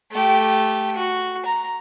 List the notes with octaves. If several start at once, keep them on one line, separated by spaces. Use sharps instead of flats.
A3 G4
F#4
A#5